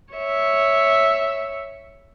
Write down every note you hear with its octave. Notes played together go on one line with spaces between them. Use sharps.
C#5 E5